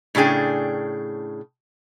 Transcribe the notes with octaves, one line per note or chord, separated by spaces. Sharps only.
A2 C#3 D4 G#4 G5